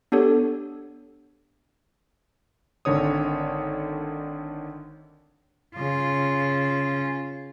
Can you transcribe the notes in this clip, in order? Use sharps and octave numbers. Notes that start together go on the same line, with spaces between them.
B3 D4 G4 A4 C#5
G#1 D3 D#3 C#5 D#6
C#3 F4